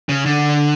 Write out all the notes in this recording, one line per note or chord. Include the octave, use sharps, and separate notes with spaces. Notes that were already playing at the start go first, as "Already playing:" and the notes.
C#3
D3